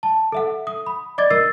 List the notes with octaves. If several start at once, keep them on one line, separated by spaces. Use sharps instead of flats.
A5
A4 E5 F#5
D#6
B5
D5 D#5 D6 G#6 A6
A#4 E6 A6 C7